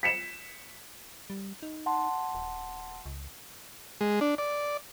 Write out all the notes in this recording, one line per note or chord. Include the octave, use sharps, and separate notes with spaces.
B6 C#7 E7
G3
D#4
F#5 A5 C6
D#1
C#2
G#3
D4
D5